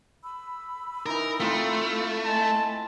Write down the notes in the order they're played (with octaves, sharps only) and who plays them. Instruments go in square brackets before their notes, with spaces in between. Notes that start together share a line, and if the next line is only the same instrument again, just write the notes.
[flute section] B5 E6
[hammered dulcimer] E3 D#4 [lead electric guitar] A#4
[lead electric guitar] A3 [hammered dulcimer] C4 E4 F4
[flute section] D#5 G#5 [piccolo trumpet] A5